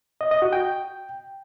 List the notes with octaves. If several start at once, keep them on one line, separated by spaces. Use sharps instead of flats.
D#5
D#5
F#4
G5